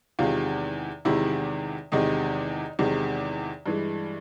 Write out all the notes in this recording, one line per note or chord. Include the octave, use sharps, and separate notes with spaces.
E2 C3 D#3 G#3 F4
E2 C3 D#3 G#3 E4
E2 C3 D#3 G#3 D#4
E2 C3 D#3 G#3
G2 E3 G#3